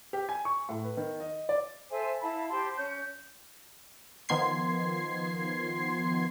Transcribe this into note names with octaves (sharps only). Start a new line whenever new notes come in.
G4
G#5
C#6
A2
B4
D#3
D#5
D5
A4 C5 E5 G#5
E4 F5 A5 B5
G4 C5 A5 C6
C#4 G6
D#3 F3 B3 C6 G#6 C7